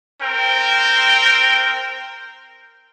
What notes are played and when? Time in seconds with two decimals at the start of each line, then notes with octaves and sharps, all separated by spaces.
0.21 C4 A#4 G5